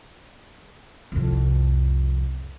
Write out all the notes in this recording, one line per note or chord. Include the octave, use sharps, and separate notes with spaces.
C2 F2